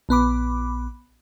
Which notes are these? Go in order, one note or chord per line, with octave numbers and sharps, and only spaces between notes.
A#1 B3 B5 D6